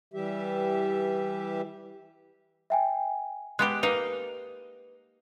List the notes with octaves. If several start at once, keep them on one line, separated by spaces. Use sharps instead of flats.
E3 G3 G4 E5
E5 G5 G#5
G#3 B3 G4 F#6
A#3 D#4 B4